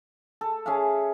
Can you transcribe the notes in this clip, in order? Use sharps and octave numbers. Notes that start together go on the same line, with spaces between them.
A4
C#4 G#4 E5 F5